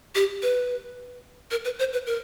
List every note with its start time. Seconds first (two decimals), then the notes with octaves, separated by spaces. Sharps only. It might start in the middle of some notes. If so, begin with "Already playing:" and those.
0.15 G4
0.42 B4
1.51 A#4
1.65 B4
1.79 C5
1.93 B4
2.07 A#4